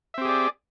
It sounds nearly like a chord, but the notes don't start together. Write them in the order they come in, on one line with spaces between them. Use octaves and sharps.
E5 C4 G4 G#4 D5